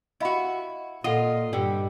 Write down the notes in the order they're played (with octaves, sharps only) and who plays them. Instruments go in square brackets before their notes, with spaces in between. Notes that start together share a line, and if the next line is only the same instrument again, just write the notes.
[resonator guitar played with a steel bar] E4 F#4 [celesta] D#5 F5 B5
[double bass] A#2 [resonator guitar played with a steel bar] F4 [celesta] A4 F#5 D#6 [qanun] D#5
[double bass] G2 [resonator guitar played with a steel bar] D3 [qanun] G3